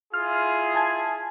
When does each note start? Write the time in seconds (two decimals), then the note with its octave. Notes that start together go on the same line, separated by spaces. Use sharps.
0.14 E4 F4 G#4 F6
0.75 G#5 A5 G#6